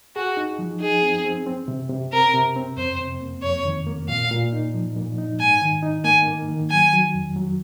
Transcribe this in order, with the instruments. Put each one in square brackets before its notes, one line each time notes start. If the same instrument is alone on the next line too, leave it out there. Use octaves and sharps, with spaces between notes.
[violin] F#4 [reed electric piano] G#4
[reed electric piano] D#4
F3
[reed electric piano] D#4 [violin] G#4
[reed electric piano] C4
C4
C4
C3
C3
[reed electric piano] C4 [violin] A#4
[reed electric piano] C3
C4
[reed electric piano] F2 [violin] C5
[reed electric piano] C3
A#3
[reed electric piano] F2 [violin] C#5
[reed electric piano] D#3
A#3
[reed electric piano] A#2 [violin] F5
[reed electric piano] A#2
D#4
F3
A#2
D#4
[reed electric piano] G#2 [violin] G#5
[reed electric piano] D#3
D#4
[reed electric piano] A#3 [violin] G#5
[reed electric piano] A#3
D#3
[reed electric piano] F#3 [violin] G#5
[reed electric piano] F#3
F2
F#3